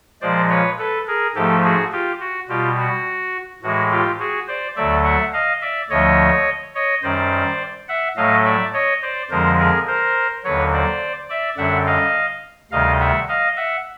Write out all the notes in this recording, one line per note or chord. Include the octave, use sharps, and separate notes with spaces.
A#2 F3 G#3 C5 D5
B4 C#5
A4 B4
G#4 A#4
G#2 F3 A3 G4 A4
F#4 G#4
F4 G4
F#4
B2 G3 F4 G4
F#4
A2 E3 G#3 F#4
F4 G4
F#4 G#4
C5 D5
D2 D3 F#3 A3 D5 E5
E5 F#5
D#5 F5
D5 E5
D2 D3 F3 A3 C#5 D#5
C#5 D#5
F#2 D#3 G3 C5 D5
E5 F#5
A2 F#3 A3 D#5 F5
D5 E5
C#5 D#5
C5 D5
F2 D3 F3 G#3 A#4 C5
G#4 A#4
A#4 C5
D#2 D3 F#3 B4 C#5
C5 D5
D5 E5
F#2 D3 G3 E5 F#5
D#5 F5
D2 C3 D#3 G3 D#5 F5
E5 F#5
D#5 F5
E5 F#5